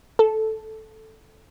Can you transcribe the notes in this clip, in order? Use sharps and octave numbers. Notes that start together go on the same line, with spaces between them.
A4